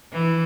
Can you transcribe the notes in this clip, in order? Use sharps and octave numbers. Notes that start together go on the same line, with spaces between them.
E3